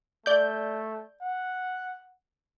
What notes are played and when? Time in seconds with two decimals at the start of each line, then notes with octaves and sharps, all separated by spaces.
0.26 A3 D5 G6
1.21 F#5